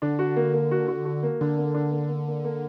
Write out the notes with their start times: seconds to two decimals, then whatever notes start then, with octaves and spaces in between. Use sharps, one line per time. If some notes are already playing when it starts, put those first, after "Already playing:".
0.02 D3 D4
0.19 F#4
0.36 A#3
0.53 A#3
0.71 F#4
0.88 F#4
1.05 F#4
1.23 A#3
1.41 D3 D4
1.58 A#3
1.74 D4
1.92 A#3
2.09 A#3
2.27 A#3
2.44 A#3